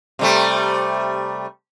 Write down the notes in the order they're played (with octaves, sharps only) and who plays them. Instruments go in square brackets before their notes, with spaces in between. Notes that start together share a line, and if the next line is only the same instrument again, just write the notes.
[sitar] C3 G3 A3